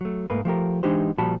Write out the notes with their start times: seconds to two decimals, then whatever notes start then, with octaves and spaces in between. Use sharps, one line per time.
0.01 F#3 A3
0.30 G#2 A3 A#3 B4
0.45 F3 A3 G4 A#4
0.83 E3 G#3 D4 D#4 G4 C5
1.18 A#2 F3 G3 F#4 A5 B5